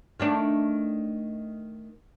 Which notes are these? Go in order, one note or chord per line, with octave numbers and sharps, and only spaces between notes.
D#3 A3 D4